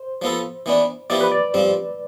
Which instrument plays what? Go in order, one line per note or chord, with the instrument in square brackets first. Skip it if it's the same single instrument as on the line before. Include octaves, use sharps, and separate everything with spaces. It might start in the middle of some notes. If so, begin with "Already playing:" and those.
Already playing: [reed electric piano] C5
[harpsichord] F3 B3 F4 A4
E3 B3 D4
[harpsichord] F3 B3 E4 G4 [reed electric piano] D5
[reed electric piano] B4
D5
[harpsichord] G2 F3 C4